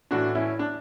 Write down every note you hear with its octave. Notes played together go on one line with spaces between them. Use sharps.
A2 E3 D4 F#4
C#4 E4
D4